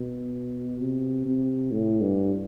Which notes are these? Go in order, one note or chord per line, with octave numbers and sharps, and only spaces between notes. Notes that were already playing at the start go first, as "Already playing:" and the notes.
Already playing: B2
C3
C3
A2
G2